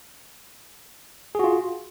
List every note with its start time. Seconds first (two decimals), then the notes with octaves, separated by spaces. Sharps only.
1.35 G#4
1.39 F#4
1.44 F4